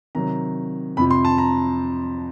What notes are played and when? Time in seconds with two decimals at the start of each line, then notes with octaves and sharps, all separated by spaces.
0.15 C3 D#3 F#3 A#5
0.97 F2 C3 F3 B5
1.11 C6
1.25 A5
1.38 A#5